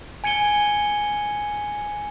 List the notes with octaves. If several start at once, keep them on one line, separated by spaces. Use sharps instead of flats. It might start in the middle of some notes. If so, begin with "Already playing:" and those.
G#5 G#6 C#7 D#7 G7